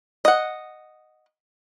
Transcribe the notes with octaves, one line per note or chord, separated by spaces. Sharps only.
D#5 F#5